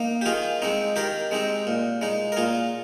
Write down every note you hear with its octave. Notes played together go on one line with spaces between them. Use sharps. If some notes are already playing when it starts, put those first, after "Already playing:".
Already playing: A#3 D#4
G4
D#3 F4 G#4
G#3 C4 D#4
D#3 G4 A#4
G#3 C4 D#4
A#2
G#3 D#4
A#4
A#2 F4 G#4